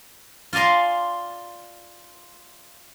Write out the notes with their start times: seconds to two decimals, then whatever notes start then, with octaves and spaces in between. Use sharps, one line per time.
0.53 F4 D5 G#5 A#5 C6